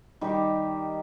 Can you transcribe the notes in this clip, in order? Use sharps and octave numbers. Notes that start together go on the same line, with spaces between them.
D#3 G3 D#4 G4